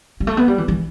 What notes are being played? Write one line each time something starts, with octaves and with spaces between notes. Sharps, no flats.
G3
A3
B3
G3
E3
E3